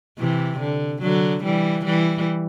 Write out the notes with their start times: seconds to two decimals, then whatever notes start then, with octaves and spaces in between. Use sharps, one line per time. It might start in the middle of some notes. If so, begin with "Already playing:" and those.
0.19 C3 E3
0.61 D3
1.03 D3 F#3
1.44 E3 G3
1.86 E3 G3